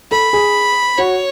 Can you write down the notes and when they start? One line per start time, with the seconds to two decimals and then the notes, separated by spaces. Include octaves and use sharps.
0.11 A4 B5
0.33 G#4
0.98 F#4 C#5